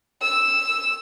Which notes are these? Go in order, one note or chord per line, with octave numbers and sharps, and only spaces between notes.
E6